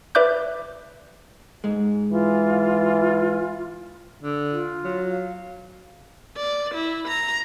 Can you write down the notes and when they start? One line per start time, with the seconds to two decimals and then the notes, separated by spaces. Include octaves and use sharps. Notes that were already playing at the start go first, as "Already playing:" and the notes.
0.15 B4 D5 E5 D6 F#6 G6
1.64 G#2 G#3
2.12 E3 F4
4.22 D3
4.51 F4
4.84 F#3
5.10 F5
6.37 D5
6.75 E4
7.08 A#5